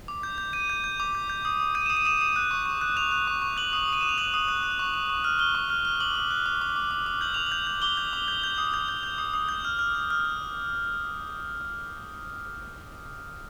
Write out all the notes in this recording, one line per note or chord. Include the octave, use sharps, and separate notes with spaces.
D6
G6
G6
G6 D#7
G6
G6
D6
G6
G6
D#6
D#6
G6 D#7
D#6 E7
D#7
D#6 E7
D#6 D#7
F#6
C#6
C#6
F#6
F#6 F7
F#6
C#6
C#6
F#6 F#7
D#6
D#6 D#7
D#6 E7
F7
F#6 F#7
D#6
F#6
F#6
C#6
C#6
C#6
F6
F6 G7
C#6
F6
F6
D6 F#7
D6
F#6
D6
D6
D6
D6
D6
G6 F#7
D6 F7
F#7
G6
G6
D6 G7
G6
D6
G6
G6
D#6
G6
G6
G6
D#6
D#6
G6
F6
F6
F6
F6